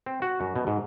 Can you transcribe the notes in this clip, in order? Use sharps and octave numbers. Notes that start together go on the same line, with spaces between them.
C4
F#4
F#2
B2
G#2